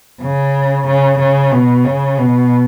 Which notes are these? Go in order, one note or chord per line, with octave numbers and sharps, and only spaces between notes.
C#3
C#3
C#3
B2
C#3
B2